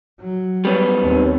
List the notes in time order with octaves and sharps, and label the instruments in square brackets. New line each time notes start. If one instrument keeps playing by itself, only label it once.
[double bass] F#3
[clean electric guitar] G3 B3 C#4
[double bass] D#2 C4